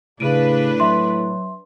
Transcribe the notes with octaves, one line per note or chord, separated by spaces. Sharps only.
A2 C#3 D4 B4 D7 D#7
F#3 E5 C6